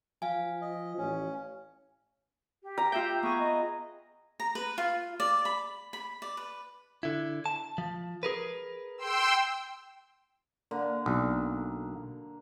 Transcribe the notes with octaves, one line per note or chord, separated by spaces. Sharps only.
F3 F5 G#5
D#5
A1 C#4
G4
A#5
F4 E5 G5
B3 G#4 C#6
D#5
A#5
B4
F4
D5
B5
B5
D5
B4
D3 E4
A5
F3
G#4 A#4 B4
G5 C6 E6
D3 A#3
B1